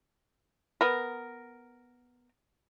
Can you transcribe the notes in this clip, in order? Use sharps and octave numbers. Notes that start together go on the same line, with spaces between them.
B3 A#4